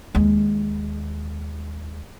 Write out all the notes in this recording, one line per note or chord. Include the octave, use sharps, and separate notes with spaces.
D#2 G#3